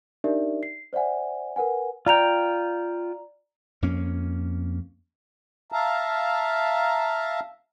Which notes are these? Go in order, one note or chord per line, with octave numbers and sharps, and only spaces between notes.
D4 D#4 G4 A#4 D5 E5
C7
C5 D5 E5 F#5 G#5
A#4 B4 F#5 G#5
F4 D5 G5 A#5 F7
F2 A#3 C#4
E5 F5 A5 A#5